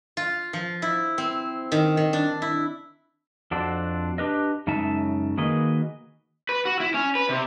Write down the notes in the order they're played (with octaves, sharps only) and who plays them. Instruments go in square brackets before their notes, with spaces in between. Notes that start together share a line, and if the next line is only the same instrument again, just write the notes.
[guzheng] F4
F3
E4
C4
D#3
D#3
D4
E4
[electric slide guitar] F2 D4 F#4 A4 C5
D4 G4 B4 D#5
F#2 C#3 G#3 D#4 E5 A5
D#3 A#3 F#4 G#4 B4 D#5
B4
F#4
E4
C#4
B4
C3